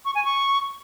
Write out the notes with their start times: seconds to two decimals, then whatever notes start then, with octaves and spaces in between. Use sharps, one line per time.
0.05 C#6
0.15 G#5
0.25 C#6